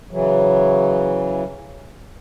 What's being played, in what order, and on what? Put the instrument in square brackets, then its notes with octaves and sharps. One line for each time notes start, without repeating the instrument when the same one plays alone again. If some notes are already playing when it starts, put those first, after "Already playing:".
[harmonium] C#3 E3 F#3